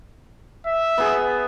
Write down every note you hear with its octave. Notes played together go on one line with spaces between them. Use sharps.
E5
B3 G#4